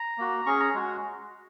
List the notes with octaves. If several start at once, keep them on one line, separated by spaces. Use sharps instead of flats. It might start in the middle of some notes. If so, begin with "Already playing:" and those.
Already playing: A#5
A#3 F#4
C#4 G#4 C#6
A#5
G#3 F#4